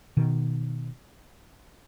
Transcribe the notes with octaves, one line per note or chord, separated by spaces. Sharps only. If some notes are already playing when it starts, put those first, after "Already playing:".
B2 D#3